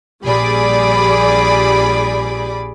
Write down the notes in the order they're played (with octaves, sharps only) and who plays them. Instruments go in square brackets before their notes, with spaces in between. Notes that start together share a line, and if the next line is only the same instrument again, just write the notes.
[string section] A#1 G3 G#4 D5 B5 D6